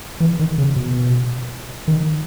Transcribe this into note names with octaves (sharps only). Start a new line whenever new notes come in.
E3
D#3
C#3
B2
D#3